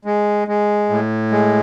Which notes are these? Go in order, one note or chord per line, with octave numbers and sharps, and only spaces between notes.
G#3
G#3
A2
G#3